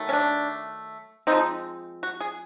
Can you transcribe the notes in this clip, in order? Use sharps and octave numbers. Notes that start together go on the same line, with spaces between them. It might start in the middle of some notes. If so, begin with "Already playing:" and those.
Already playing: D#3 F#3 A3
C#4
D4
F3 G#3 C4 D#4
F#4
G#4